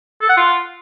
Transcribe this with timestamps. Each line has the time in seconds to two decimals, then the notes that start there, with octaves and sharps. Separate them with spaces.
0.22 A4
0.29 F#5
0.37 F4